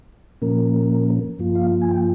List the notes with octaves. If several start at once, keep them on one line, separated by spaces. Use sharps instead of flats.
A#2 F3 A#3 C#4 A#4
G2 F3 A#3 F4
F5
G#5
G5